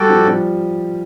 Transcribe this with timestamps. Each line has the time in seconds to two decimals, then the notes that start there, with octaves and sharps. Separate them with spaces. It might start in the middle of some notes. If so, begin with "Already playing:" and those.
Already playing: G3 F#4 A4 D5 G5
0.09 F3
0.27 F3